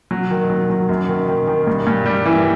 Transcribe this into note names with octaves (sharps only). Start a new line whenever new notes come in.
F#3
D#3
F#3
F#3
F#2
D#3
D#3
D#3
G2
G2
G3
E3